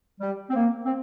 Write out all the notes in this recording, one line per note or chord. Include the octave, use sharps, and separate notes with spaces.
G3
C4
A#3
C4